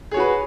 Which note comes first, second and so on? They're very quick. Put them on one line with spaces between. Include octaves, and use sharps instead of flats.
G#4 C#5 F#4 B4